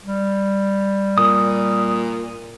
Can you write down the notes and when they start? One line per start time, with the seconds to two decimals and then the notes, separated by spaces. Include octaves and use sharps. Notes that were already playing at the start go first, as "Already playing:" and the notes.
0.05 G3
1.18 A#2 D#6